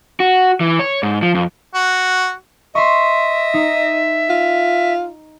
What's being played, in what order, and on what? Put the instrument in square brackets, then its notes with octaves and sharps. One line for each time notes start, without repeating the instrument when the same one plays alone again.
[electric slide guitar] F#4
E3
C#5
G#2
F3
F2
[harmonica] F#4
[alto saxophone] D#5 [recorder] E5 [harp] C6 C#6
[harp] D#4
[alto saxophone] F4